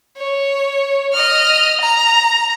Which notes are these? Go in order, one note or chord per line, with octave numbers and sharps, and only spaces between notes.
C#5
D#5 F6
A#5